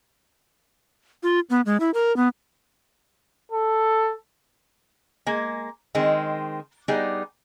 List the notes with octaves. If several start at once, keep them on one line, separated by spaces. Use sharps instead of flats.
F4
B3
G#3
E4
A#4
B3
A4
G#3 A#3 G#5
D#3 G#3 C4
G3 B3 D#4 G#4